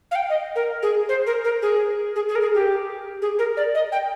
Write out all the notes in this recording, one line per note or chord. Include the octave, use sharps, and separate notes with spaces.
F5
G5
D#5
A#4
G#4
C5
A#4
A#4
G#4
G#4
G#4
A#4
G#4
G4
G#4
A#4
D5
D#5
G5